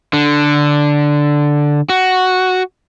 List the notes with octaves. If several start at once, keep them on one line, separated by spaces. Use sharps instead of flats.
D3
F#4